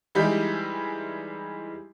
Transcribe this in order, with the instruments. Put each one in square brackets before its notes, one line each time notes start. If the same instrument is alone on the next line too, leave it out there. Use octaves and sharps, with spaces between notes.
[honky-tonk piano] E3 G3 G#3 D#4 E4 G4